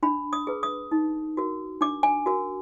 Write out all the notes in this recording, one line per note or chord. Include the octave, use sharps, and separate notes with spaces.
D4 B5
D#6
G#4 B4
D#6
D#4
F#4 A#4
D4 D6
G#5
F#4 A#4